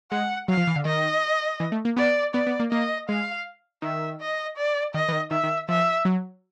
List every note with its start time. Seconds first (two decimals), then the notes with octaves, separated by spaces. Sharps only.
0.12 G#3 F#5
0.48 F#3 F5
0.57 F3
0.67 E3
0.76 D3
0.85 D#3 D#5
1.60 E3
1.72 A3
1.85 A#3
1.97 B3 D5
2.34 B3 D5
2.47 B3
2.60 A#3
2.71 A#3 D#5
3.09 G#3 F5
3.82 D#3 E5
4.21 D#5
4.57 D5
4.94 D#3 D#5
5.09 E3
5.12 D#3
5.31 D#3 E5
5.44 D#3
5.69 F3 E5
6.05 F#3